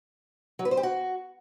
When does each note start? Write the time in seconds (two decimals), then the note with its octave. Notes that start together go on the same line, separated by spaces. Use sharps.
0.59 F#3
0.65 B4
0.71 C5
0.77 G4
0.83 F#4